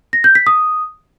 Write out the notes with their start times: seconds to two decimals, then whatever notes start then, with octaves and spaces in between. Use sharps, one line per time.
0.13 A#6
0.24 G6
0.35 B6
0.47 D#6